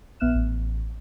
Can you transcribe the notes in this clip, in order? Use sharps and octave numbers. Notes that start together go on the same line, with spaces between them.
A#1 B3 E5 F6 F#6 E7
A1